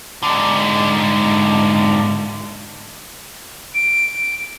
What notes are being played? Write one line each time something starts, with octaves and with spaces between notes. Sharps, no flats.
G#2 D3
D7